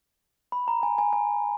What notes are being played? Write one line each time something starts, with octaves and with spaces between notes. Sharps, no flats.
B5
A#5
G#5
G#5
G#5